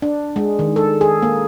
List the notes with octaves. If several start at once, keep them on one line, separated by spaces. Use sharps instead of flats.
D4
G#3
D#3
A4
G#4
A#3